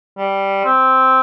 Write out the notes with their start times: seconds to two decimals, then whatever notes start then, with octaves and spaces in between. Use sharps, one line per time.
0.18 G3
0.64 C4